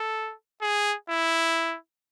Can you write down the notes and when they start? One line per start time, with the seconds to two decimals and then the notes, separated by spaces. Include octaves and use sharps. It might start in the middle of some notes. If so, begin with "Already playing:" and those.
Already playing: A4
0.62 G#4
1.09 E4